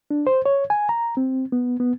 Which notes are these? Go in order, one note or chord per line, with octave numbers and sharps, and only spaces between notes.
D4
C5
C#5
G#5
A#5
C4
B3
B3